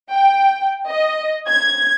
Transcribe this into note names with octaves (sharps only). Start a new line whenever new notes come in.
G5
D#5
G#6